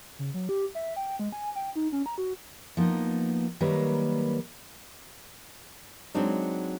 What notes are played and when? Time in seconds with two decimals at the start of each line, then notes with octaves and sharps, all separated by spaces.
0.19 C#3
0.34 F#3
0.49 G4
0.75 E5
0.96 G5
1.19 G#3
1.32 G#5
1.55 G5
1.75 D#4
1.92 C#4
2.06 A#5
2.18 F#4
2.77 F3 A#3 B3 D#4
3.60 D#3 F#3 G3 A#3 A#4 B4
6.15 F#3 G#3 C4 D4 D#4